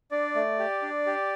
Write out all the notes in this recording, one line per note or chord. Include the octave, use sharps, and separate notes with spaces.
D4 D5
A3
G4
D4
G4